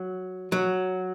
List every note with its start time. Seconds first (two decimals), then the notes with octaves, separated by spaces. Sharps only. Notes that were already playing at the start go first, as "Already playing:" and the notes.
Already playing: F#3
0.52 F#3